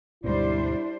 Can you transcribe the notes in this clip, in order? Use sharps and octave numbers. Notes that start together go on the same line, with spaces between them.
D2 G#2 B2 G3 D4 E4 C5